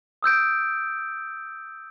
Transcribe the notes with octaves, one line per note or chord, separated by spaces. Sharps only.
D#6 E6 G6 D7